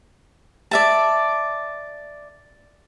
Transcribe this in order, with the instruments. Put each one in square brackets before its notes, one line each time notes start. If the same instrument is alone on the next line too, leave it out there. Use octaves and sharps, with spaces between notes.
[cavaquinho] D5 E5 A5